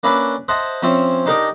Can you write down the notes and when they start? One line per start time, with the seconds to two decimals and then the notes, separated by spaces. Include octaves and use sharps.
0.03 A#3 C#4 D4 B4 D5 E5
0.48 C5 D#5 E5 F#5 A5
0.82 F3 C4 C#4 C5 C#5 E5
1.26 D4 D#4 G4 A#4 D5 D#5